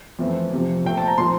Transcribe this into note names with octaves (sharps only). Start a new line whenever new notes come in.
F2 E3 A3 C4
F2 C3 F3
A#2 A3 C4 G5
A5
A#5
A#2 F3 C4 C6